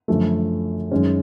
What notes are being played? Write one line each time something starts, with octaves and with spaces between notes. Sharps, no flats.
F#2 D3 F3 A3
F#2 D#3 G#3 C#4